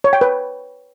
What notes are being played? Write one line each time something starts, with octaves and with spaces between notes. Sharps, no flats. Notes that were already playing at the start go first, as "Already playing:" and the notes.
C#5
G5
B4